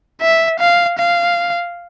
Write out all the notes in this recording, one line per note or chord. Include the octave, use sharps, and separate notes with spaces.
E5
F5
F5